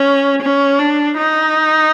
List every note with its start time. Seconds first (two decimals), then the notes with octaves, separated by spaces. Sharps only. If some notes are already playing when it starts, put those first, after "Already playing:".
Already playing: C#4
0.42 C#4
0.79 D4
1.18 D#4